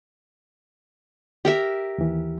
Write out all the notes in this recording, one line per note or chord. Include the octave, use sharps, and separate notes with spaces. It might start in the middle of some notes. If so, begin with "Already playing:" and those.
G4 A#4 E5
D#2 E3